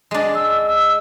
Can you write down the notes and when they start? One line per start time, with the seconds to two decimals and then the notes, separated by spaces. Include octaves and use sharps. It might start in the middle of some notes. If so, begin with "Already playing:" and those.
0.11 G#3 D4
0.34 E6
0.66 E6